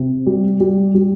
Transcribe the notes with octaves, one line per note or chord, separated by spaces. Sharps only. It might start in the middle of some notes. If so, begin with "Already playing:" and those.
Already playing: C3
G3
G3
G3